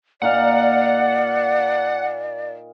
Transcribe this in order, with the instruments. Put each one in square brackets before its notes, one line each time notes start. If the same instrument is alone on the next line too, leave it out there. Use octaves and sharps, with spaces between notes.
[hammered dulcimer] A#2 D#4 F5 [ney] D5 [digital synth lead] F#5